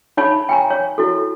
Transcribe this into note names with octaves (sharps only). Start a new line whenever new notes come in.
D#4 C#5 A5 B5
G5 G#5 A#5
C#5
E4 F#4 A4